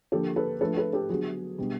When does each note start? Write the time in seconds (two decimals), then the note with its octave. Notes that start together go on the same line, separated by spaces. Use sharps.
0.12 D3 F3 A#3 G4 A4
0.36 A4 B4
0.61 F3 A3 D4 A4 B4
0.77 A4 B4
0.93 G4 A4
1.09 D3 F#3 B3 F#4 G#4
1.58 B2 G3 B3 D4